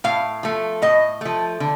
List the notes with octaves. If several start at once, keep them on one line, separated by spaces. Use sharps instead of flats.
A2 F5
F3 A3
A2 D#5
F3 A3
D3